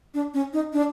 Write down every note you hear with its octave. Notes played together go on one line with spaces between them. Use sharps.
D4
C#4
D#4
D4